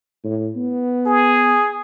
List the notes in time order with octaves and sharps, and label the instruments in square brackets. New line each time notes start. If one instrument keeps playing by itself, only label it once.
[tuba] A2
B3
[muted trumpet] G#4